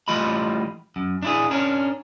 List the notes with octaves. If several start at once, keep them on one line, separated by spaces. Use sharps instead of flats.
E3 G3 A3 F4 D#5 B5
F#2
D4 E4 G#4
C#4 D4 A#4